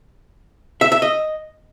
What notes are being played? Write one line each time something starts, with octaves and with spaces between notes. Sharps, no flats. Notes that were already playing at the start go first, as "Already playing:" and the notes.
E5
E5
D#5